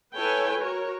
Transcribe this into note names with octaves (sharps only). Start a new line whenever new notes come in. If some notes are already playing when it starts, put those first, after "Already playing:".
E4 A4 B4 C#5 G5 G#5
F#4 A#4 C#5